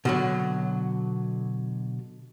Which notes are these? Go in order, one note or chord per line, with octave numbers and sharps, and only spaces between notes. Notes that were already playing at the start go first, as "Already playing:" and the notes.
B2 D3 F#3